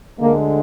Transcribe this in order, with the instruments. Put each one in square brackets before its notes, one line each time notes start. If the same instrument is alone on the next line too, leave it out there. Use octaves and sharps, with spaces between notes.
[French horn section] D2 D3 G#3 A#3